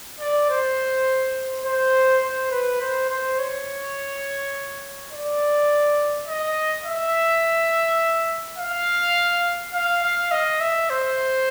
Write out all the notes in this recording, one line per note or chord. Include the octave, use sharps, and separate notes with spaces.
D5
C5
C5
C5
B4
C5
C5
C#5
D5
D#5
E5
F5
F5
F5
D#5
E5
C5